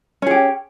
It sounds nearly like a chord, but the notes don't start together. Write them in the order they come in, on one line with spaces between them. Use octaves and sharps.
C#4 G#4 G4